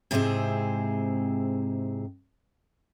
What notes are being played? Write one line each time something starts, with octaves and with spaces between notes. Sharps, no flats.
G#2 C3 C4 D#4 E4 G#4